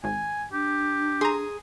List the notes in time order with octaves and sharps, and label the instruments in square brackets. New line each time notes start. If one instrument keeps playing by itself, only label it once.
[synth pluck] G#1 [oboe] G#5
[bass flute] D4 [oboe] G4
[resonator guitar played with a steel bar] G#4 [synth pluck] A#5 C6